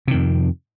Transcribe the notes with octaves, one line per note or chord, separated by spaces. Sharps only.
F2 C3 D#3